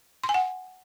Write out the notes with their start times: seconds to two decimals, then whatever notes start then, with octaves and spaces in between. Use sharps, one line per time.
0.24 C6
0.29 G#5
0.34 F#5